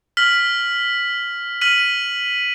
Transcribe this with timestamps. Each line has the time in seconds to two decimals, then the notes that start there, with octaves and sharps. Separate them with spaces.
0.17 F6 B6 F#7
1.61 F6 B6 D#7 F#7